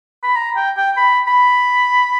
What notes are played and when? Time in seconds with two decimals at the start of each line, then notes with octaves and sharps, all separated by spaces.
0.23 B5
0.36 A#5
0.56 G5
0.77 G5
0.97 B5
1.28 B5